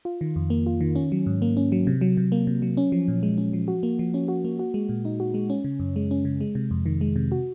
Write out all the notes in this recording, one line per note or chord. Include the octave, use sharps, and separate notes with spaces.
F4
D#3
F2
A#3
F4
D#3
C#4
F#3
G#2
A#3
C#4
F#3
C3
F#3
C3
A#3
C3
F#3
C#4
F3
A#2
G#3
C#4
F3
F#4
A#3
F3
C#4
F#4
A#3
F#4
G#3
A#2
D#4
F#4
G#3
C#4
C#3
F#2
G#3
C#4
C#3
G#3
C3
F2
D#3
G#3
C3
F#4